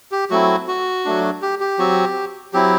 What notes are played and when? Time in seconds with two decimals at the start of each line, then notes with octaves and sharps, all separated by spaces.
0.12 G4
0.30 F#3 A3 C4 E4 F#4
0.68 F#4
1.05 F#3 A3 D4
1.42 G4
1.60 G4
1.79 F#3 C4 F#4
2.53 F#3 C4 E4 G4